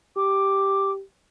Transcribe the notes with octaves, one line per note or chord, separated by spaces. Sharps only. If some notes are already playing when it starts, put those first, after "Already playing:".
G4 D6